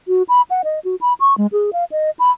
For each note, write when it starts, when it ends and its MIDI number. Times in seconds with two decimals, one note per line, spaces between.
0.08 0.23 66
0.29 0.42 83
0.50 0.62 78
0.64 0.79 75
0.85 0.95 66
1.01 1.13 83
1.20 1.37 85
1.38 1.47 56
1.52 1.71 68
1.73 1.84 77
1.92 2.10 75
2.19 2.31 83